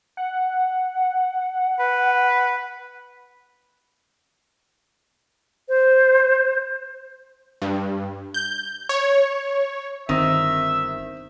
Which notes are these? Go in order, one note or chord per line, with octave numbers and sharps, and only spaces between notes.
F#5
B4
C5
G2
G6
C#5
G1 D#3 C4 E5